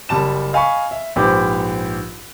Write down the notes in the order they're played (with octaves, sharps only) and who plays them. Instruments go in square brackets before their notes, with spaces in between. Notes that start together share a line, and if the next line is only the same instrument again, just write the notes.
[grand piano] F#1 G3 A5 E7
D#5 F5 G#5 B5 C#6
E5
A#1 G#2 G4 B4 C5 D6